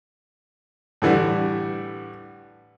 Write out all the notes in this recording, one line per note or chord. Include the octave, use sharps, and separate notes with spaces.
A2 D3 E3 G3 D4